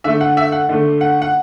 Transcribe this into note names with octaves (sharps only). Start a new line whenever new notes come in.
D3 A3 E5
F#5
E5
F#5
D3 A3
F#5
F#5